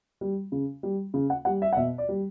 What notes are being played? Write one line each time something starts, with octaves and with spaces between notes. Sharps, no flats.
G3
C#3
G3
C#3
F#5
G3 F#5
E5
F#5
B2 E5
D5
G3